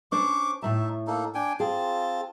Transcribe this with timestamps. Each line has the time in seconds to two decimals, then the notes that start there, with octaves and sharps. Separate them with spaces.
0.12 C#4 D4 C5 C#6 D6
0.62 A2 A3 D#4 E5 A5
1.07 A#3 D#4 A4
1.35 D4 G5 G#5
1.60 C4 F4 G#4 A5